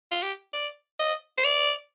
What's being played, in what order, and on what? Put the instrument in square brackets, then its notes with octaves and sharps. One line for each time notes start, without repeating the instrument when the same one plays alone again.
[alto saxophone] F4
G4
D5
D#5
C5
D5